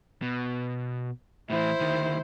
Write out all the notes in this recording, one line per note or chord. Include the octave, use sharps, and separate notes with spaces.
B2
A2 E3 E4 C5
D2 D#3